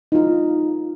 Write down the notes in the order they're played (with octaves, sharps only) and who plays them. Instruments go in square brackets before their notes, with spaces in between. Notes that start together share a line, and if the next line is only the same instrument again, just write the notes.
[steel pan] D#4 F4